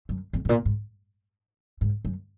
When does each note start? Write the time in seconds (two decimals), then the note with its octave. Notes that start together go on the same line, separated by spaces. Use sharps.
0.09 F#2
0.33 F2
0.45 G#2
0.49 A#2
0.65 G#2
1.81 G#2
2.05 F#2